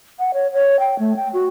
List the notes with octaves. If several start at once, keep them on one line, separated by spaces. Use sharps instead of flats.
F#5
C#5
C#5
G5
A3
G5
F#4